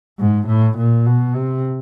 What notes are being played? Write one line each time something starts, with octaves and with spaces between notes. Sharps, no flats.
G#2
A2
A#2
B2
C3